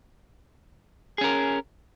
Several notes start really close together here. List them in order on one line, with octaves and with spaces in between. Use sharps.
G#4 C#4 A#4